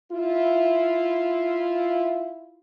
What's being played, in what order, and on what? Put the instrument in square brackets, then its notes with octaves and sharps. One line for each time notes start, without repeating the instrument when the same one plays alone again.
[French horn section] E4 F4